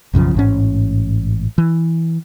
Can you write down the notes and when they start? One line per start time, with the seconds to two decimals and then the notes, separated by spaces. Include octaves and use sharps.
0.14 B1 F#2 C#3 F3
0.34 A1 G#2 C#4
1.58 E3